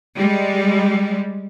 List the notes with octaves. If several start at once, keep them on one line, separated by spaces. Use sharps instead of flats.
G3 G#3